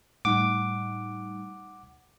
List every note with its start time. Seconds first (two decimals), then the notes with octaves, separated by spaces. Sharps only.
0.25 A2 G3 D#4 F#5 D6